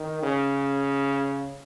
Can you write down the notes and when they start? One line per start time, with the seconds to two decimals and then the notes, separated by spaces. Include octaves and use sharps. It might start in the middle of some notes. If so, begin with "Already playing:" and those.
Already playing: D#3
0.23 C#3